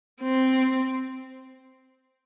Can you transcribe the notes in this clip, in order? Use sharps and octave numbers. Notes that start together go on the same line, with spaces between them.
C4